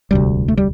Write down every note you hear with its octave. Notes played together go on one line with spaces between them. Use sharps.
E1 D2 C3 G3
A3
G3